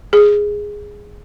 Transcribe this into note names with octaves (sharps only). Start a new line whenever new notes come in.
G#4